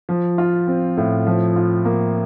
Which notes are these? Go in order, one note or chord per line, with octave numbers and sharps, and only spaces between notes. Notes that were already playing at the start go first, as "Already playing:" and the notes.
F3
F4
C4
A2
F3
F4
A#3